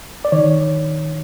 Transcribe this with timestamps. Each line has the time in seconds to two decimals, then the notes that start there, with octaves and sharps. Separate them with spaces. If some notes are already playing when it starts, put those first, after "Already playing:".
0.25 D5
0.32 D#3 C#5